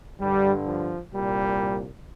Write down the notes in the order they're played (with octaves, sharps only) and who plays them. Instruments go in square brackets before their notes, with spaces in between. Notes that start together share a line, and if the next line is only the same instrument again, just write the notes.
[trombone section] G2 D3 G3
F3
C2 A#2 G3